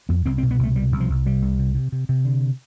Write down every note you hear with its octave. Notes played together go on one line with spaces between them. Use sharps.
F2 B3
C2 C4
C4
B2
B3
C2 A3
B2 G3
C2
F3
C2
C3 G3
C2
C3
C3
C3
C3
D3